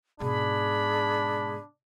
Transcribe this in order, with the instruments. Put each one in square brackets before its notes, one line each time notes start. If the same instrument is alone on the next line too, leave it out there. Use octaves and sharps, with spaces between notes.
[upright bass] G#2 B2 [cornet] D4 [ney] G#4 [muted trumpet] B5